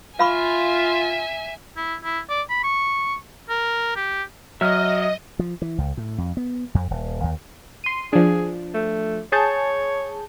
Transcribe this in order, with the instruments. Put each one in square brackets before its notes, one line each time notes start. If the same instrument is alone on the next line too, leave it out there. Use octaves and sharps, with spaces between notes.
[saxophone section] F4 [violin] E5 G#5 [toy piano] F5 B5 C#6
[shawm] E4
E4
D5
B5
C#6
A#4
G4
[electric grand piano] F#3 [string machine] D#5 [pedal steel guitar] E5 F6
[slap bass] F3
E3
C#2
A2
F2
B3
F2
D#1
D#2
[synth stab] C6 D#7
[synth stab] F3 D4 [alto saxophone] G#4
[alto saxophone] A3
[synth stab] G#4 A5 G6 [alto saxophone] C#5